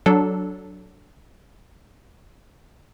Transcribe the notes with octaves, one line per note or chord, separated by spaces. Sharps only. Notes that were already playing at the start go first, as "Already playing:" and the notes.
F#3 D4 A4